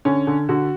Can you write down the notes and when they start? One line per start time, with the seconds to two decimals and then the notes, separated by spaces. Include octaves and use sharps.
0.05 D3 C#4
0.27 D3
0.49 D3 F#4